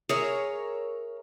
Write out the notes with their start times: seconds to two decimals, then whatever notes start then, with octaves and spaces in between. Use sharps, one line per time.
0.09 G#4 A#4 C#5 E5